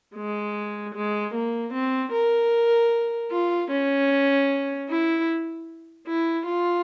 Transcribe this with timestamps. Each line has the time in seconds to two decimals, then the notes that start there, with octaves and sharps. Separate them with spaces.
0.15 G#3
0.95 G#3
1.34 A#3
1.73 C4
2.12 A#4
3.32 F4
3.71 C#4
4.89 E4
6.07 E4
6.46 F4